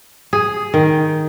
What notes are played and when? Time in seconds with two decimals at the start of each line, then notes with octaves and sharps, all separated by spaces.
0.33 G#4
0.74 D#3